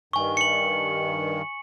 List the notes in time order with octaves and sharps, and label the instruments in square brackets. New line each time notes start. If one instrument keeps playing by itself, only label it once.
[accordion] G2 D#3 [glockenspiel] G#5 C#6
[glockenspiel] C#7 F#7